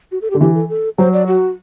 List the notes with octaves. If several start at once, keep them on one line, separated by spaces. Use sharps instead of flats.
F#4
A4
G4
D3
E3 G4
A4
A4
F#3 C5
D5
F#4